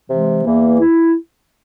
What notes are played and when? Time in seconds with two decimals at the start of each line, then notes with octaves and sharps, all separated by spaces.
0.10 C3 E3 G#3
0.45 E2 E3 A#3
0.80 E4